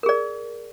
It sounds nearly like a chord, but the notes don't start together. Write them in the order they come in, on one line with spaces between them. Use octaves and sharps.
A#4 G#4 D5